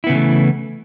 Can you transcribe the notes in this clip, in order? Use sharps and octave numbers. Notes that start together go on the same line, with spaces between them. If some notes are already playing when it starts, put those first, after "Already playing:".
C#3 E3 A3 B3 E4